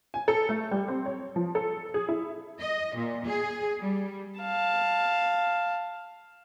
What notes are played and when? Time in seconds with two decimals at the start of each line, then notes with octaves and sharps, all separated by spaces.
0.14 G#5
0.28 A4
0.49 A3
0.71 G3
0.88 C4
1.06 C#5
1.36 F3
1.55 A4
1.94 G#4
2.09 E4
2.61 D#5
2.96 A#2
3.27 G#4
3.80 G3
4.39 F5 A5